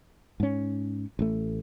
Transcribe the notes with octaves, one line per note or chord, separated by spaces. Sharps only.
G#2 C#4
A1 A3